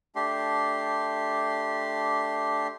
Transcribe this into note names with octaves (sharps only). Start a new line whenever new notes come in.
A3 D4 G4 C6